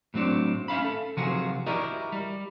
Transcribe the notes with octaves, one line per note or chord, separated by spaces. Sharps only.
A2 F#3 C4 D4
C#4 E5 F5 B5
A4
C3 F3 F#3 F4 F#4 G#4
E4 F#4 G4 A#4 D5 D#5
G3